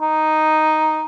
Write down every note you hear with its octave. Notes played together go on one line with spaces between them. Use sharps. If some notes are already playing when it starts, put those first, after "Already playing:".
D#4